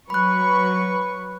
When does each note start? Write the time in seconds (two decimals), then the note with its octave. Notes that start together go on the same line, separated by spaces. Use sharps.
0.10 F#3 B4 B5 C#6 F#6